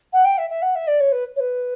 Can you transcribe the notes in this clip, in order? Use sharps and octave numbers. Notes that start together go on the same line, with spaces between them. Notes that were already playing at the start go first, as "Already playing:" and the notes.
F#5
G5
E5
E5
F#5
E5
D5
C#5
B4
C#5
B4